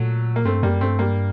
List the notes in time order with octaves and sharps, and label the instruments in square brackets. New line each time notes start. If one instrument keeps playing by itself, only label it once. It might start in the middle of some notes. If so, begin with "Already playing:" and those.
Already playing: [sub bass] A#2 [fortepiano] F#3 A3
[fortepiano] A#3
[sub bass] G2 [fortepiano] A3 C4
[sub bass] F#2 [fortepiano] G3 A#3
[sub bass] G2 [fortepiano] A3 C4
[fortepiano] G3 A#3